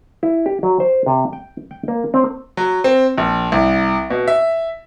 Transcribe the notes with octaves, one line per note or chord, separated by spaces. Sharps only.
E4
G4
F#3
C5
C3
G5
G5
A#3
C4
F#3
C4
A#1
C2
B2
E5